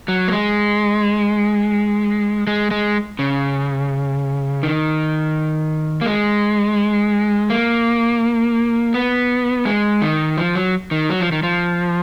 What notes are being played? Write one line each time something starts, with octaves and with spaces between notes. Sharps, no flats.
F#3
A#3
G#3
G#3
G#3
C#3
D#3
A#3
G#3
A#3
B3
G#3
D#3
F3
F#3
D#3
F#3
F3
D#3
F3